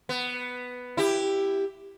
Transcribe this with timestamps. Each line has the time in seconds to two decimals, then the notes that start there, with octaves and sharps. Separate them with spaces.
0.09 B3
0.97 E4 G4